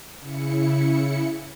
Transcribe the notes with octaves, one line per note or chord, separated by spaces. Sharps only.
C#3 E4 C#7